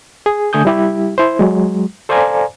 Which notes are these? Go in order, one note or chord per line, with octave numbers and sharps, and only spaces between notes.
G#4
D3 A3 G#5 D#6 G6
G3 E4 G4
E4 C5
F#3 G#3
A4 C5 D5 F5 G#5 A#5